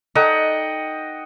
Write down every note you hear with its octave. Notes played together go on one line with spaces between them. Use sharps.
D#4 A4 D5 D#5 F#5 G5